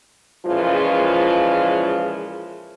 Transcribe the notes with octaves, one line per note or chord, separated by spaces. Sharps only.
A#2 C#3 E3 F3 G#3 F4